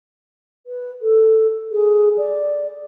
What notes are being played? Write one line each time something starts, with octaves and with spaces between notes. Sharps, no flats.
B4
A4
G#4
D5